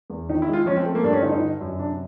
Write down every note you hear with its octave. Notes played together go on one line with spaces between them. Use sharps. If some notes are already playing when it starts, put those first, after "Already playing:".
E2
D#3 D#4
E4
G#3
F4
F3 C#4
C4
A3
A#3
G2 D4
C#4
D3 D#4
D#4
D3
F#2
C3 D4